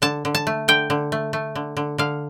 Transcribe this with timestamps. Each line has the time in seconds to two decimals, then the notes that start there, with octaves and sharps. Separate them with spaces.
0.02 D3 A5
0.25 D3
0.35 A5
0.47 A3
0.68 D3 G5
0.90 D3
1.12 A3
1.33 A3
1.55 D3
1.77 D3
1.98 D3 F5